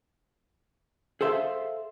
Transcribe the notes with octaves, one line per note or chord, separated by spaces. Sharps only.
G#4 A4 C5 E5 F5